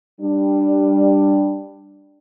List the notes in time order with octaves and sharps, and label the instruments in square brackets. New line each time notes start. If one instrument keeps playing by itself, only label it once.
[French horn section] G3 D4